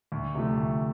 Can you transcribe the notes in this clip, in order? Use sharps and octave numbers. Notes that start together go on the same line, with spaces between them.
D2
C3 F3 A3
D2